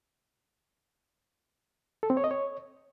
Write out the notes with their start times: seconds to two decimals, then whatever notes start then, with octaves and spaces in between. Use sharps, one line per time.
2.03 A4
2.10 C4
2.17 C#5
2.24 D#5
2.31 C#5